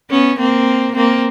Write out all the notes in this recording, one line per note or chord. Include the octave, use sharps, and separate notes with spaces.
B3 C#4
A#3 C4
A#3 C4